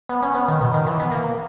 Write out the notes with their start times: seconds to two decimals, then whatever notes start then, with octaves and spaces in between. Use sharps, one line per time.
0.09 B3
0.22 C#4
0.35 B3
0.48 D#3
0.61 B2
0.74 D#3
0.86 E3
1.00 B3
1.11 A#3